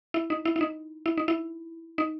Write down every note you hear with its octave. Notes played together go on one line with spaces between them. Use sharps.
E4
D#4
E4
E4
D#4
E4
D#4
E4
D#4